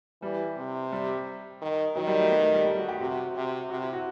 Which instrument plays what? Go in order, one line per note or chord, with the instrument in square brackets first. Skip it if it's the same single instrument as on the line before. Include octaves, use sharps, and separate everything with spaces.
[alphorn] E3 [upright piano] G3
[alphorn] C3
[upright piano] G3
[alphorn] D#3
[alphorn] D#3 [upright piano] F#3
[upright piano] G3
A3
B3
A3
G3
G3
F#4
G4
[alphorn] C3 [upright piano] F#4
[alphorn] C3
[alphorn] C3 [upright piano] F#4
[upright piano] E4
F#4